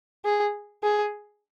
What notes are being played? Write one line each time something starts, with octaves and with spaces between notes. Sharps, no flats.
G#4
G#4